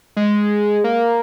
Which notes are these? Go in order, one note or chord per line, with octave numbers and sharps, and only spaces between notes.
G#3
A#3